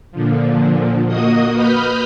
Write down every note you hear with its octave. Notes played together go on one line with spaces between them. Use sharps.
A#2 D3 F3
A#3 F#4 D#5 D#6
B4 B5 D#6 F6 G6